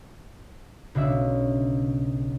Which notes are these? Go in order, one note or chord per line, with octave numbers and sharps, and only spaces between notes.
B1 C#3 F#3 D4 E5